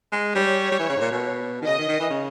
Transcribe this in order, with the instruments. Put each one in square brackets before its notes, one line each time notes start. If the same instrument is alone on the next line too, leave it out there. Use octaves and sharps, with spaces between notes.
[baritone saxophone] G#3
[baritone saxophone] G3 [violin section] C#5
[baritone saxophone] G3
E3
C#3
G#2
A#2
B2
D#3
[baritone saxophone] C#3 [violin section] D#5
[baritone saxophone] D#3
D#3
E3
C#3